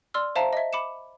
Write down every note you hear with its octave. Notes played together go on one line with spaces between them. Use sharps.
D5 C6 E6 F6
C5 E5 F5 A5 A#5
D#5 E5
B5 D6 C#7 E7